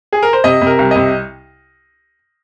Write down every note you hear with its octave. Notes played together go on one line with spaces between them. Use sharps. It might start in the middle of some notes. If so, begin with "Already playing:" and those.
G#4
A#4
C5
C3 D#5
C3
A#4
C2
C3 D#5